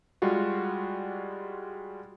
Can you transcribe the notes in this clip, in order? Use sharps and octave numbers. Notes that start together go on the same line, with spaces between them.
G3 G#3 F4 F#4